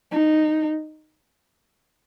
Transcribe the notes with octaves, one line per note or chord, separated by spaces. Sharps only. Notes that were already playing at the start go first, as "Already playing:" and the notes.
D#4